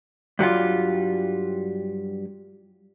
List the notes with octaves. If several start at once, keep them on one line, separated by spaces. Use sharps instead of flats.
G2 F#3 G3 F4